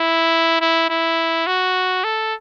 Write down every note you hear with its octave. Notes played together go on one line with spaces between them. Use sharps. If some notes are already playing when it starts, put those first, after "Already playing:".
Already playing: E4
E4
E4
F#4
A4